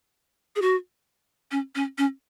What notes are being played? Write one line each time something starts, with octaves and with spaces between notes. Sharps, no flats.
G#4
F#4
C#4
C#4
C#4